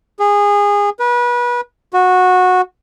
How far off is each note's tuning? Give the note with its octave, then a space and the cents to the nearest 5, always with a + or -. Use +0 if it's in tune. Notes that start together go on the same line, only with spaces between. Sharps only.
G#4 -25
B4 -30
F#4 -15